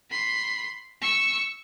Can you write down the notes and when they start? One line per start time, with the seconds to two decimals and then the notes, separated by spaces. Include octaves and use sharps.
0.10 B5 C6
1.02 C#6 E6